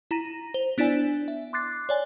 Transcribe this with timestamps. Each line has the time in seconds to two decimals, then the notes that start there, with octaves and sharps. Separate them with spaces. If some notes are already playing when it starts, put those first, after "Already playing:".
0.11 E4 A#5 A#6 D#7
0.54 C5
0.78 B3 D4 E4 D5 G#5
1.28 E5
1.53 C6 D6 F#6 A6 C7
1.89 C#5 D5 G#5